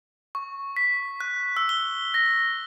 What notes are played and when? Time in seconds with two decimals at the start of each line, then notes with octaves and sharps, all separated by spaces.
0.35 C#6
0.77 B6
1.20 F#6
1.57 E6
1.69 G7
2.14 A#6